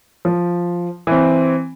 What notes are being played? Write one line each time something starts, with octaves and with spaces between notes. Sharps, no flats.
F3
E3 C4